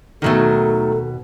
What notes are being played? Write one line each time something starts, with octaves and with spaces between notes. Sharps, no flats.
D#2 B2 D#3 F#3 A3 A4